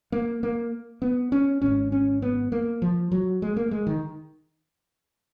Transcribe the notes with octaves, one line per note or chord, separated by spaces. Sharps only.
A#3
A#3
B3
C#4
G#1 G#2 C#4
C#4
B3
A#3
F3
F#3
G#3
A#3
G#3
D#3